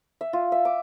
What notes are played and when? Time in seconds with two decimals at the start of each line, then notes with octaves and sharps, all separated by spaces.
0.21 E5
0.33 F4
0.52 E5
0.65 D6